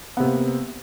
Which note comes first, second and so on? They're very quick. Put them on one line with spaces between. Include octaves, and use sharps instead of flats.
B3 C3 A#3